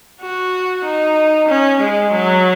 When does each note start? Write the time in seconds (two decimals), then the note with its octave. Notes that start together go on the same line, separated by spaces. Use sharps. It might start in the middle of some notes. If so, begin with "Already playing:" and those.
0.21 F#4
0.85 D#4
1.48 C#4
1.80 G#3
2.12 F#3